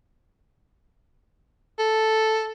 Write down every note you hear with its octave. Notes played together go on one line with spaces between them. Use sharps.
A4